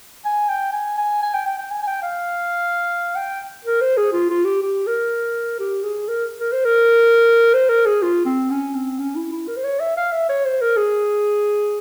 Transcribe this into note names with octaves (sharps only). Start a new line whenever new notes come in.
G#5
G5
G#5
G#5
G#5
G5
G5
G5
G#5
G#5
G5
F5
G5
A#4
C5
G#4
F4
F4
G4
G4
A#4
G4
G#4
A#4
A#4
C5
A#4
C5
A#4
G#4
F4
C4
C#4
C4
C#4
E4
E4
A#4
C5
C#5
E5
F5
E5
C#5
C5
A#4
G#4